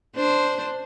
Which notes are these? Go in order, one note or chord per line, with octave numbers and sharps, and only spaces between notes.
D4 C5